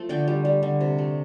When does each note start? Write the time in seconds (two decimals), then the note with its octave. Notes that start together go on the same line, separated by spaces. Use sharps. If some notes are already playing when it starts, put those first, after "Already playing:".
Already playing: F3 A3
0.09 D3 D5 G5
0.28 G3
0.45 G3
0.63 D3
0.81 C3
0.98 A3